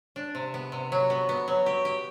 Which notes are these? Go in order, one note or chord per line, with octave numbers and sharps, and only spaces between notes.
D4
C3
B3
C3
F#3
B3
B3
F#3
G4
G4